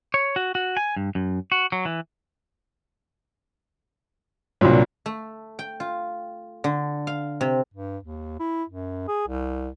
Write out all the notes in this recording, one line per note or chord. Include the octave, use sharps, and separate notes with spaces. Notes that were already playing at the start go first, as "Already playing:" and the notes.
C#5
F#4
F#4
G#5
G2
F#2
F#4
F#3
E3
C2 A#2 F#3 D4
A3
G5
F4
D3
F5
C3
G2
D#2
E4
F#2
G#4
C2